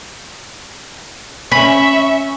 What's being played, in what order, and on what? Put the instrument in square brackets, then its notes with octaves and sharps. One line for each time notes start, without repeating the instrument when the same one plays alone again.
[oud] C#4 [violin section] E5 C#6 [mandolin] B5